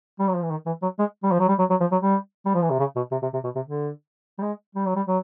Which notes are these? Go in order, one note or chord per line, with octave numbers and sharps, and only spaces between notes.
G3
F#3
F3
E3
D#3
E3
F#3
G#3
G3
F3
F#3
G3
F#3
F#3
F3
F#3
G3
G3
F3
E3
C3
C#3
B2
C3
C3
C3
B2
C3
D3
G3
G#3
G3
F#3
G3
F#3